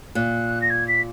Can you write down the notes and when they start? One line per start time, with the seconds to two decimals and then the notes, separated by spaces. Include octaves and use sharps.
0.15 A#2 F#6
0.61 A#6
0.70 G#6
0.88 B6